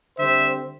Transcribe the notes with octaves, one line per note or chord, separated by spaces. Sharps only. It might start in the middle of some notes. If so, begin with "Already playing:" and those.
D3 G3 C4 C5 E5